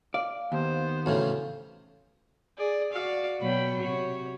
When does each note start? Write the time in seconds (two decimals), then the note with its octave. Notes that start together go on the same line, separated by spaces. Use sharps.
0.14 D5 F5
0.52 D#2 B3 C5
1.06 E2 A2 C#3 F#4 C#5
2.57 G#4 D5
2.92 F#4 D5 F5
3.41 B2 F#3 B3 G5 B5
3.81 C3 F#4 C#5